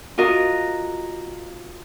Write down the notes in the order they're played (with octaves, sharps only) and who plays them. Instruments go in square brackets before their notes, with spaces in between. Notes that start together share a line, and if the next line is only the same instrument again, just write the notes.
[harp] F4 F#4 A#4 D#5